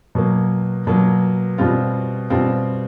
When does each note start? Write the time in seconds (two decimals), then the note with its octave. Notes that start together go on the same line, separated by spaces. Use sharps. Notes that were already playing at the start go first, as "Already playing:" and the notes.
0.15 B2 F#3 A#3
0.87 B2 F#3 A#3
1.58 B2 G3 C4 F4
2.30 B2 G3 C4 F4